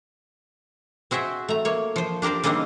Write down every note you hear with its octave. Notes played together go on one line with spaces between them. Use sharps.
C4 F#4 G#4 E5 G5
A3 A#5
A#3 C#5
F3 C5
D4 G4 A#4 C5 D5
C#3 G3 A#3 C4 D4 D#4